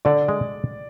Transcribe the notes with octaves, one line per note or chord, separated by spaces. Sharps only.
D3 D5
G#3